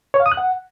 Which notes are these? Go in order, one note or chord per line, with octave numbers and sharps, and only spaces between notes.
C#5
F5
D#6
F#6
F#5